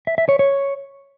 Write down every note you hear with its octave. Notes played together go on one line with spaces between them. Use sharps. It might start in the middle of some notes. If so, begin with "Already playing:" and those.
E5
E5
C#5
C#5